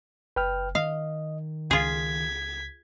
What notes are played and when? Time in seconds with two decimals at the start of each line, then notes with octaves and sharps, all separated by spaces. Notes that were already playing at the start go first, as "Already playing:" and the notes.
0.36 F#1 B4 G5 F6
0.75 D#3 D#5 F5
1.71 C#2 F4 G#4 G#6 B6